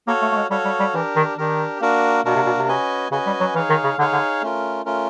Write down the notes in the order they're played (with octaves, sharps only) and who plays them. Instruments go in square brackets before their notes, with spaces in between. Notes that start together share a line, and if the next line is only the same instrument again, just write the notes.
[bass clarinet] A#3 [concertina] F#4 A4 C#5 F5
[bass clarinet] A3
A3
G#3
[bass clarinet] G3 [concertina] F#4 A4 C#5 F5
[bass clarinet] G3
G3
[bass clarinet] E3 [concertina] D4 G4 A#4
[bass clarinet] D#3
[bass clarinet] D#3 [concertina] D4 G4 A#4
[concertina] A#3 D4 F#4 A#4
[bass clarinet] B2 [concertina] A#3 D4 F#4 A#4
[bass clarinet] C3
B2
C3
[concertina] C#4 F#4 B4 D#5 G#5
[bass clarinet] C#3 [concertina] C#4 F#4 B4 D#5 G#5
[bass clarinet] G3
F#3
[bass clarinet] E3 [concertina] D#4 G#4 C#5 F5
[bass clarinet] D#3
C#3
[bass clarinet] D3 [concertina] D#4 G#4 C#5 F5
[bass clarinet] D3
[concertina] A3 C#4 F4 A#4
A3 C#4 F4 A#4